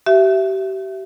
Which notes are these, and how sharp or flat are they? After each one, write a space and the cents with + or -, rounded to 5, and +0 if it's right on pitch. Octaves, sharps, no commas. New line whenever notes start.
G4 -35 E5 +10